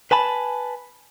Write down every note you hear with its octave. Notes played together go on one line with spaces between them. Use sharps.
B4 G#5 A5 B5